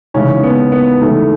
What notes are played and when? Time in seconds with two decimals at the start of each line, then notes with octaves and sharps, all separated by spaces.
0.14 D#2 C#3 E3 G#3 C#4
0.43 B3
0.72 B3
1.01 D#2 C#3 E3 G#3 A3